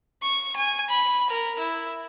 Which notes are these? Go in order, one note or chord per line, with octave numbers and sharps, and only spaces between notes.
C#6
G#5
B5
A#4
E4